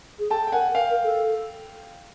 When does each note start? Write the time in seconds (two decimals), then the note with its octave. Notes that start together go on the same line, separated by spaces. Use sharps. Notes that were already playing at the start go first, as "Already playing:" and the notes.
0.19 G#4
0.30 A4 G5 A5
0.47 G5
0.52 A#4 F#5 G#5
0.75 A#4 F5 G5
0.90 A#4
1.04 A4